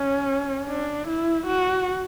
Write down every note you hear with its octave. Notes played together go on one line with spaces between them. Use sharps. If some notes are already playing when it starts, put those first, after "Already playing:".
Already playing: C#4
D4
E4
F#4